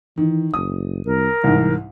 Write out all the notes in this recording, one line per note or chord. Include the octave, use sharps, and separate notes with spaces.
D#3 E3
F#1 D#6
C2 A#4
C2 G#2 E3